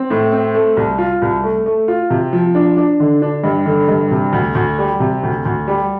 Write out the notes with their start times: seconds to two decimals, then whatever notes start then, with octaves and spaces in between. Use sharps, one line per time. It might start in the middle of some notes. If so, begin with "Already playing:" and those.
Already playing: C4
0.10 A2
0.32 C4
0.54 A3
0.77 C2
0.98 F4
1.22 C2
1.44 A3
1.66 A3
1.88 F4
2.10 C3
2.33 F3
2.55 D4
2.77 D4
3.00 D3
3.22 D4
3.44 G2
3.66 D3
3.88 G2
4.11 C3
4.33 D2
4.55 D2
4.79 G3
5.00 C3
5.23 D2
5.45 D2
5.68 G3